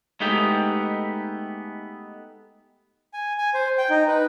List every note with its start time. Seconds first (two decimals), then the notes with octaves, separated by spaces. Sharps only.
0.20 G#3 A3 B3 D#4 G4
3.13 G#5
3.38 G#5
3.54 C5
3.78 G5
3.90 D#4
4.08 B4